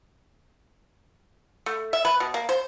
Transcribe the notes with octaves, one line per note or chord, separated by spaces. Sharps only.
A3
E5
B4
B2
A#3
C5